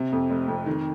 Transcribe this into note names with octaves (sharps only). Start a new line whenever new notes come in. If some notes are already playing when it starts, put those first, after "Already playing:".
Already playing: C3
F2
F1
F2
D#3